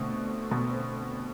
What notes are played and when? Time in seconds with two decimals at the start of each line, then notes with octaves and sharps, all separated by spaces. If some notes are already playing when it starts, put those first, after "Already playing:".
Already playing: B2 D3 A3 C4
0.51 B2